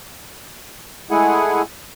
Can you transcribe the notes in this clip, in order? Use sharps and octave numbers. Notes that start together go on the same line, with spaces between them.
G#3 A3 E4 G#4 F#5 G#5